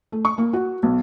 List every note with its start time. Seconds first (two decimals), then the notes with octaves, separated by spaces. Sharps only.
0.12 A3
0.25 C#6
0.38 A#3
0.53 F#4
0.83 B1